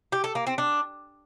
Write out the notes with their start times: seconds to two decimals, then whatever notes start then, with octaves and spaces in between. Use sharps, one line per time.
0.12 G4
0.24 A4
0.35 A#3
0.47 C4
0.58 D4